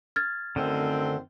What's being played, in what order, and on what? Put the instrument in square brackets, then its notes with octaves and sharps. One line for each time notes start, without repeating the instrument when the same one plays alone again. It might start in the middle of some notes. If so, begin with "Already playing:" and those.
[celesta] F6 G#6 A6
[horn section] F#2 D#3 C4 [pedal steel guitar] D3 A3